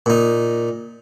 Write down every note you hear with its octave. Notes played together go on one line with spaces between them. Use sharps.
A#2 D#4